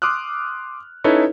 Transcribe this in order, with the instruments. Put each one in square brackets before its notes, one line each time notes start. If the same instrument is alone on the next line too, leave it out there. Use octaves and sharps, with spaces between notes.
[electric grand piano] C6 D6 D#6 F6 F#6
C#4 D#4 E4 A4 B4 C#5